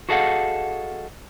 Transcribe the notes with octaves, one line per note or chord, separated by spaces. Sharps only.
F#4 G#4 A4 D#5 F5 F#5